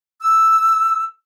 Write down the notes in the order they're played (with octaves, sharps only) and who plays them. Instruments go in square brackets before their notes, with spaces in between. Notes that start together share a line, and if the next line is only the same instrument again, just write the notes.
[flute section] E6